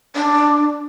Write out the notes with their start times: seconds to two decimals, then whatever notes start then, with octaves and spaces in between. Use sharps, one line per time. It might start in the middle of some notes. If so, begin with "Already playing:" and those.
0.16 D4